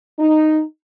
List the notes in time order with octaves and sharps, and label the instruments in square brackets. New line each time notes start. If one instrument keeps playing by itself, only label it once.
[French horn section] D#4